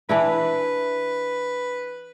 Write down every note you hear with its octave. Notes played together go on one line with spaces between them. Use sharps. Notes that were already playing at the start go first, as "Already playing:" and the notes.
E3 D4 E4 B4